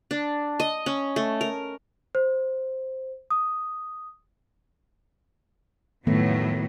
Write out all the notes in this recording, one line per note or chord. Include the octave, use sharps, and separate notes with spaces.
D4
D#5
C#4
A3
A#4
C5
D#6
F2 A2 D#3 F#3 A3 B3